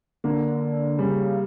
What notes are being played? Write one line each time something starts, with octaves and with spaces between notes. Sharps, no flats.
D3 A#3
C#3 G3